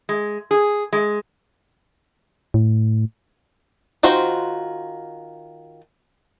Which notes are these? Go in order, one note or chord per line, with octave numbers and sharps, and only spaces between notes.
G#3
G#4
G#3
A2
D#3 F4 F#4 C5